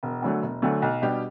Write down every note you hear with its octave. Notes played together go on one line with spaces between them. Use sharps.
E1
D2 D3 F#3 A3
E1
D2 D3 F#3 A3
B1
B2 G3 D4 G4